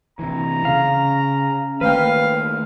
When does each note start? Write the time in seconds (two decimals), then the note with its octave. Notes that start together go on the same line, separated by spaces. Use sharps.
0.19 C3 E3 A#5
0.64 C#3 C#4 F5
1.81 D#3 A3 A#3 B4 F5 G5